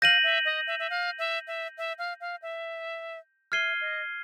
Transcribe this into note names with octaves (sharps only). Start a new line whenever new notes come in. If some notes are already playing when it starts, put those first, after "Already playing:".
F5 G6 A#6 D#7 F#7
E5
D#5
E5
E5
F5
E5
E5
E5
F5
F5
E5
E5 F6 G#6 C7 D#7 G7
D#5